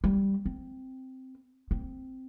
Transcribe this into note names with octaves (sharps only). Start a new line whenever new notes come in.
G3
C4
C4